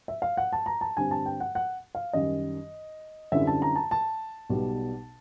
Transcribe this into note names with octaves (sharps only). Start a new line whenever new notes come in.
E5
F5
F#5
A5
A#5
A5
G2 D3 G3 C4 G#5
A5
G5
F#5
F#5
F5
F#2 D#3 G3 D#5
F#2 D3 G3 C4 E4 E5
A5
A#5
A5
A5
B1 B2 G3